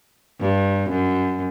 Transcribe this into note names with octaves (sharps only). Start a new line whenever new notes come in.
G2
F#2